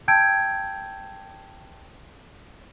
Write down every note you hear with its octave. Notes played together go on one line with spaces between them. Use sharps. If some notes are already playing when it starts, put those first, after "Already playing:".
G5 A5 E6 G6 G#6 D7